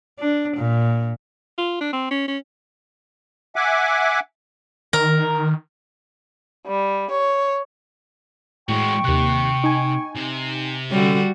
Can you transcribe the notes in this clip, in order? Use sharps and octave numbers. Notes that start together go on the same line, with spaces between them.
D4
A#2
F4
D4
C4
C#4
C#4
E5 F#5 G#5 D6
D#3 A#4
G3
C#5
A2 G#3 F#4 G5 C#6
D#2 C3 G4 F#6
D#4 G#5
C3
D3 G3 C#4 F#4